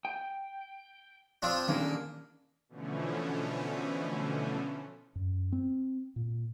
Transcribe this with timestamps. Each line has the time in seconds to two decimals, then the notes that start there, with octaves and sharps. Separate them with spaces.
0.05 G5
1.42 F3 C4 D4
1.68 D#3 A#3 C#4 D4
2.69 B2 D3 E3 F3 A3 C#4
5.15 F#2
5.52 C4
6.16 A#2